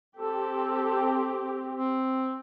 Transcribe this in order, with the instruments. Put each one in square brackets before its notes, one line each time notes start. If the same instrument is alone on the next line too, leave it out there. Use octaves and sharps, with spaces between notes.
[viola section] C4 G4 [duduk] A4
[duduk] C4